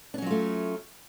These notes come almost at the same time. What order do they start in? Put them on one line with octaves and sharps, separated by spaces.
D4 C#4 F#3 F4 A3